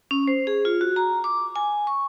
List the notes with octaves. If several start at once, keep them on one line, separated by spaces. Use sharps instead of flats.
C#4
C5
G#4
F4
F#4
A#5
D6
G#5
C#6